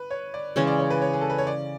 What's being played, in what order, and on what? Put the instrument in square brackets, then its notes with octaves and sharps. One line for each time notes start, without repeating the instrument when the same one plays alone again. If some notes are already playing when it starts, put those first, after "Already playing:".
Already playing: [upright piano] B4
C#5
D5
[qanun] C#3 E3 G#3 C#4 [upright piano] C#5
[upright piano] D5
C#5
B4
C#5
G#4
A4
B4
C#5
D5